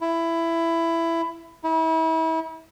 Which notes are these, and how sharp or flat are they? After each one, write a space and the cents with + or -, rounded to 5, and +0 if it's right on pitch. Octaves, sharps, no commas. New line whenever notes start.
E4 +15
E4 -35